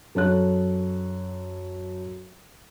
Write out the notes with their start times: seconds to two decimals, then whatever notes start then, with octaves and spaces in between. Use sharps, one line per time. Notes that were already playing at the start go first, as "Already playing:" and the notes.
0.15 F#2 A4 C#5 F#6